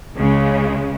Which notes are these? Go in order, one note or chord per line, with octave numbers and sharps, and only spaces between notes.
C#2 C#3 G#3